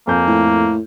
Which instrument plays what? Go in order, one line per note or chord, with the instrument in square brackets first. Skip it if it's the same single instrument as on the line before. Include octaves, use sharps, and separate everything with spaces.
[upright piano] F2 G#5 G6 [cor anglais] A#3
[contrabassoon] A2